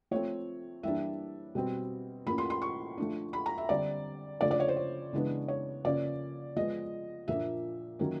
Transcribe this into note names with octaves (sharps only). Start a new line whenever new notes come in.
F3 A3 C4 C#5
E3 G3 A#3 D4 E5
B2 G3 C4
A2 F3 A#3 C#4 B5
C6
C6
C#6
F3 A3 D4
B5
A#5
E5
D3 G3 C4 D5
C#3 F3 A3 D4 D5
D5
C#5
C5
C#5
C#3 E3 G#3 B3 D4
C#5
C#3 F3 A#3 C#4 D5
F3 G#3 B3 D#5
A#2 F3 A#3 D4 E5
D#3 F#3 A#3 C#4